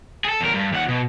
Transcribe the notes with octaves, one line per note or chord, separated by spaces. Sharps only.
G#4 A4
E2 A#4
G2
D#2 F#5
B2